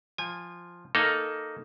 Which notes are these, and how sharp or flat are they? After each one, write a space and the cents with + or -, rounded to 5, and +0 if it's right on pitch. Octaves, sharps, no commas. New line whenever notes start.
F3 +0 G#5 -25
A#3 +0 D#4 +0 A4 +0